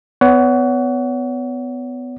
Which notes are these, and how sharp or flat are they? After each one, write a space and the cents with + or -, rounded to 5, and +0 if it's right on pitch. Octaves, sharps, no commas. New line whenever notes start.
B3 +25 C#5 +35 F#5 +10